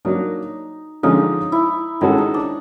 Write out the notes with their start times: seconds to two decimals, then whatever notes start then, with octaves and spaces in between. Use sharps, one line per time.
0.05 F#3 A#3 D4 D#4
1.03 D3 F3 G#3 C#4 D#4 F4
1.52 E4
2.01 D#3 G#3 C#4 D#4 F#4 A4
2.18 D#4
2.34 D4